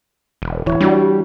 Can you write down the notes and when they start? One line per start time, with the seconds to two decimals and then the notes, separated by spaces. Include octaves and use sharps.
0.42 E1
0.66 D1 E3 E4 C#5
0.81 G3 D4 E4 F#4